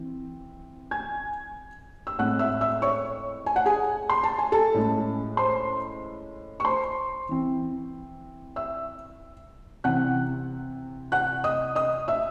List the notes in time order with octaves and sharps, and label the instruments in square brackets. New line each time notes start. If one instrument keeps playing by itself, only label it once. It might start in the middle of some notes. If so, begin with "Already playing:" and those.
Already playing: [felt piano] E3 C4
G#5 G#6
E6
A2 G#3 C4 F#5 F#6
E5 E6
E5 E6
C#5 C#6
G#5
F#5
G#4 G#5
C6
A5
G#5
A4 A5
A2 G#3 C#4
C5 C6
C#6
C5 C6
E3 C4
E5 E6
C3 E3 C4 F#5 F#6
F#5 F#6
D#5 D#6
D#5 D#6
E5 E6